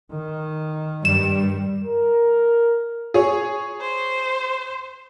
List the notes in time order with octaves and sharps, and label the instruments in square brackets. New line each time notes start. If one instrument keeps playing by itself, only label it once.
[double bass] D#3
[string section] G2 [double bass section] G3 [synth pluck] E7
[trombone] A#4
[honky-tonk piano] G#4 C#5
[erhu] C5